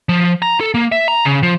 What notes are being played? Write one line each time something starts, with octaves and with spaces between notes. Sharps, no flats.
F3
A#5
A4
A#3
E5
A#5
C#3
F3